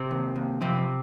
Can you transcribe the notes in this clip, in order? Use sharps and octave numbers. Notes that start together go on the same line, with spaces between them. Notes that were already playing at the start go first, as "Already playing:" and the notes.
Already playing: C3 C4
D#2
D#2
F2 C3 C4